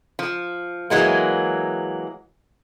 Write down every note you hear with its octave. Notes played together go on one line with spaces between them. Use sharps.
F3
E3 F#3 G#3 A#3